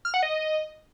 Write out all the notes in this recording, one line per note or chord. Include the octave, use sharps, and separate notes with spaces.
F6
F#5
D#5